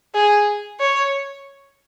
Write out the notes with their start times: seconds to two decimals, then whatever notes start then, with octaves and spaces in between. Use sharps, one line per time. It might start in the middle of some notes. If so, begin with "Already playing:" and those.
0.15 G#4
0.80 C#5